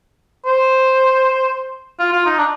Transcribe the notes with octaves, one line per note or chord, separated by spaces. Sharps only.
C5
F4
F4
D#4
D4